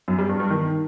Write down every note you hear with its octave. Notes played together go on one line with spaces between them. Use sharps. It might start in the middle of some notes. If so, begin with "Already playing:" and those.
F#2
G3
G2
G2
D#3